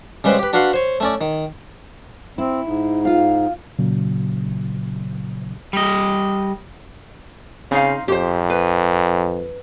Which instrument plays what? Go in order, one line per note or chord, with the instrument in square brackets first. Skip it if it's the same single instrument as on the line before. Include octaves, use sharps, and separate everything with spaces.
[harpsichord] C#3 G3 G#3 B4 C5
G4 B4
D4 F#4 B4 F5 F#5 C6
C5 C#5
A3 C#4 D5
D#3
[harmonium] C4 [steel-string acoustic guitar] E4
[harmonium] G#2
[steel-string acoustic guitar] F4 F5
[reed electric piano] A#2 C#3 F#3
[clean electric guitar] G3 D#5
[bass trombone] C#3 [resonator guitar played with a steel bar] C4 D#4 F5
[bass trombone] F2 [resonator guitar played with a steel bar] G4 C5
[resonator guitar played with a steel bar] B4